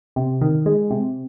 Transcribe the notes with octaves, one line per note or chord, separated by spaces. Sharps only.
C3
D#3
G#3
C3